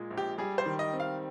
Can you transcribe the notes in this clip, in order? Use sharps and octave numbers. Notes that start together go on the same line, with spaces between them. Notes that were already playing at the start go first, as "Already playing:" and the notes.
Already playing: A#2 G#3
A#1
G4
G3 G#4
C5
D#3
D#5
C4
F5